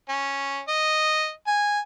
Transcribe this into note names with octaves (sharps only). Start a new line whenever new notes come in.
C#4
D#5
G#5